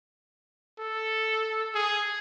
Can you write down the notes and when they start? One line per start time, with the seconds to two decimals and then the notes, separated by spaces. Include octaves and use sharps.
0.79 A4
1.75 G#4